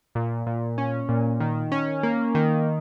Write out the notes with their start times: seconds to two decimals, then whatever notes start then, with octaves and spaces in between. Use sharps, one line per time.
0.15 A#2
0.46 A#2
0.78 C#4
1.09 A#2
1.40 D#3
1.72 C#4
2.03 A#3
2.35 D#3